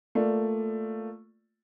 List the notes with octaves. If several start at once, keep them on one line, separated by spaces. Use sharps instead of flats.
A3 A#3 F4 D5